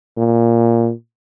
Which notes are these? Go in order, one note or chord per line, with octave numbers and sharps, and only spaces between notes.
A#2